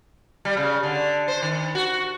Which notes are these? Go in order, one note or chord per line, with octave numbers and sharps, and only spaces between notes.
G3
C#3
D3
C5
D#3
F#4